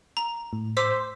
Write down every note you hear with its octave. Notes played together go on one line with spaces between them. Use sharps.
A#5
A2
C5 D6 E6 B6